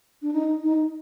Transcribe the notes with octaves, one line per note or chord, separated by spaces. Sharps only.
D4
D#4
D#4